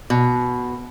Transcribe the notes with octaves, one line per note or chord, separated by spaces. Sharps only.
B2